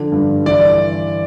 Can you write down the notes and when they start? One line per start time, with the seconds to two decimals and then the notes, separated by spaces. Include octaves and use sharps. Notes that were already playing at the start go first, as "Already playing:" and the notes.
Already playing: D3 F3
0.12 G2
0.46 E3 D5